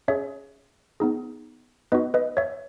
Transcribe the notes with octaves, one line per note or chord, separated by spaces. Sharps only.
C#4 G#4 C#5 E5
B3 D#4 G#4
B3 D#4 F#4 B4 D#5
B4 D#5
C#5 E5